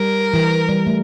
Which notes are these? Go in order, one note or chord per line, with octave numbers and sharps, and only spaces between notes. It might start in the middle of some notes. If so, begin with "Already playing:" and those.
Already playing: G3 A#4
E3
G3
A3